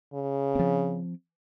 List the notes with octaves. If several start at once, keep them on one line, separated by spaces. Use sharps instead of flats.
C#3
F3 C4